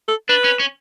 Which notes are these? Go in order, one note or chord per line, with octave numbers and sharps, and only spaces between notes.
A4
D4 B4
C#4
C#4